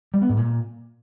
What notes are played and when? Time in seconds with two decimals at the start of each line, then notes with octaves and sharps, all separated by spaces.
0.14 G3
0.21 B3
0.29 G#2
0.37 A#2